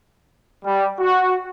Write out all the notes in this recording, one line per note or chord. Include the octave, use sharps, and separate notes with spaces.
G3
F#4